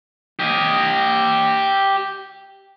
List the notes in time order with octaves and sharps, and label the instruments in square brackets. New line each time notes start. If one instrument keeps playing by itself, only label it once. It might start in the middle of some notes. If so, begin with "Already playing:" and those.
[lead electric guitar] G4 D#5